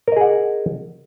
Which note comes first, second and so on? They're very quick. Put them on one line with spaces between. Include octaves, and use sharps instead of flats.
A#4 D#5 G#4 F#5